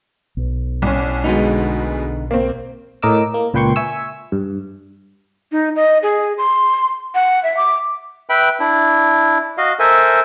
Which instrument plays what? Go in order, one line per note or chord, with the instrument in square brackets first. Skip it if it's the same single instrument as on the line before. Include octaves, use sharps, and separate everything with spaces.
[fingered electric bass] B1
[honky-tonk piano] C2 C#4
[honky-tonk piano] D2 B2 G#3 [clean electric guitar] D3 B3 D#4
[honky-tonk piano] A#3 C4
[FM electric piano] A2 A#4 D#5 D6 E6
A#3
C#2 A#2 B4 G5 C6 C#6
E5 G#5 C#6 E6
G2
[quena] D#4
D#5
G#4
C6
F#5
E5
D6
[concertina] B4 E5 G5 B5
D4 E4
F#4 D#5 F5
A4 A#4 C5 E5 G#5